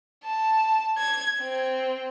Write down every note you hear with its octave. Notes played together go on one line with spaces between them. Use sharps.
A5
G#6
C4